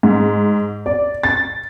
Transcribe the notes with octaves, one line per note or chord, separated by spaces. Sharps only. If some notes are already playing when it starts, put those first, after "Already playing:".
G#2
D5
A6